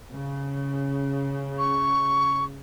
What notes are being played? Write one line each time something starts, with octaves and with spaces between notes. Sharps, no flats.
C#3
C#6